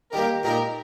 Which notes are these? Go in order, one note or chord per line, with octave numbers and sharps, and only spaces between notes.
D#3 G3 A#3 G4 A#4
A#2 G#3 D#4 G4 A#4